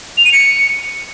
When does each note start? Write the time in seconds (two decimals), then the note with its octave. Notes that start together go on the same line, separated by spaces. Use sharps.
0.17 F7
0.25 D#7
0.32 C#7